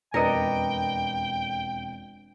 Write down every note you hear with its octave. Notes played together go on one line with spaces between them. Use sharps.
E1 F2 D4 A#4 B4 D#5 G5 C#7